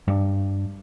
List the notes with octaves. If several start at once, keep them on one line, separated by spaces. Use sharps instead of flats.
G2